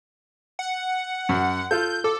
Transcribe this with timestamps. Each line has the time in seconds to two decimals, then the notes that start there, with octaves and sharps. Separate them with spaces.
0.59 F#5
1.29 F#2
1.71 F4 A4 G6
2.04 A4 D6